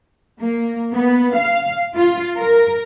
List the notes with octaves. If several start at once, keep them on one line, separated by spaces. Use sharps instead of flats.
A#3
B3
F5
F4
A#4